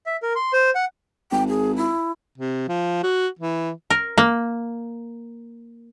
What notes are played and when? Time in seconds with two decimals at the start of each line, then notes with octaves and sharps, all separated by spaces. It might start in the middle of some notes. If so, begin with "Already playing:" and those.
0.06 E5
0.22 A#4
0.36 C6
0.53 C5
0.75 F#5
1.31 G#1 G5
1.48 G#4
1.76 E4
2.38 C3
2.68 F3
3.03 F#4
3.39 E3
3.90 A#4
4.18 A#3